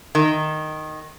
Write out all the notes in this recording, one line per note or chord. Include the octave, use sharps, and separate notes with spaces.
D#3